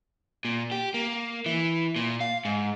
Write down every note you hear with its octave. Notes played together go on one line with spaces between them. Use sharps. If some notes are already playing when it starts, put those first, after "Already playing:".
A#2
G4
A#3
E3
A#2
F5
G#2